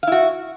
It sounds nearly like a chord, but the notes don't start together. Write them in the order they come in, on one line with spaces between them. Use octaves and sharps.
F5 E4 F#4